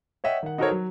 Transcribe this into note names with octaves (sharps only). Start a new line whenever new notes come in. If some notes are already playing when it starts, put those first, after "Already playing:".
C#5 D#5 E5 F#5 G5
D#3 F#5
D#4 F#4 A4 A#4 C5 C#5
F#3